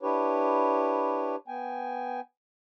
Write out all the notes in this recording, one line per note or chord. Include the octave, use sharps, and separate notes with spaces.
D4 E4 G4 B4 C#5
B3 G5 G#5